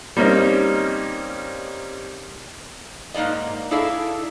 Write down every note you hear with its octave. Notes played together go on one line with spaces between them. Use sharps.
G3 A#3 C4 C#4 D#4
G#2 A#3 D#4 D5 D#5
D#4 E4 G#4 A4 D5 F5